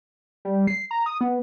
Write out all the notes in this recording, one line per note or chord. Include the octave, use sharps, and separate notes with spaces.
G3
C7
A#5
D#6
B3